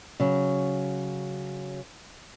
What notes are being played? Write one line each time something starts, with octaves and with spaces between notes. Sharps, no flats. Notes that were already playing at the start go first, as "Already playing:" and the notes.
C#3 F#3